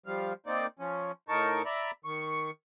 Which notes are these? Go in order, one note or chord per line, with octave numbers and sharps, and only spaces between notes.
F3 G3 F5
A#3 C4 D#4 D5
F3 C#4
A2 D#4 A#4 A5 C#6
D5 E5 A#5 B5
D#3 C#6